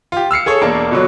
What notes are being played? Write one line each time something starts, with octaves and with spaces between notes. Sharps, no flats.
F4 G4
E6 F6 C7 C#7
G#4 A4 C#5
E1 A#3 D4 A5
B2 D3 F#3